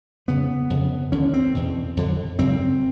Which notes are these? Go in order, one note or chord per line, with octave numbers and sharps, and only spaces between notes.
F2 C#3 B3
F2 C#3
D#2 D3 C#4
C4
E2 B2
F2 D3
F#2 C#3 C4